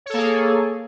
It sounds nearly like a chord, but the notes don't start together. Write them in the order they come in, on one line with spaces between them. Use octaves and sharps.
C#5 A4 A#3 G#4